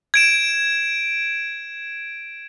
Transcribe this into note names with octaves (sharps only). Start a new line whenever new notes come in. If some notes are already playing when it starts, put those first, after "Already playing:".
G#6 D7 E7